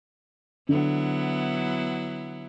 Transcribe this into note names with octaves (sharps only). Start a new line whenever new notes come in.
D3 F#3 B3 E4